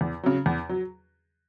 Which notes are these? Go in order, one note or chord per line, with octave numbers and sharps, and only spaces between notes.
E2
C#3 F#3
E2
F#3